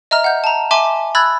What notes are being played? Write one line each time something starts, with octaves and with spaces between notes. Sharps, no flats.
D#5 E5 A#5 F6
F#5 G6
A5 A#5
E5 G#5 A5 C6 D6
B5 E6 F#6 G#6 A6